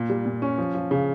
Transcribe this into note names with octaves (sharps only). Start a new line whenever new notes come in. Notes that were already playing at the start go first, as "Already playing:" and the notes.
Already playing: A#2
G3
A#2
C#4
F3
F3
C#3